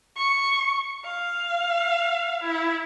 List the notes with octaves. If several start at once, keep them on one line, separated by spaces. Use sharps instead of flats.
C#6
F5
E4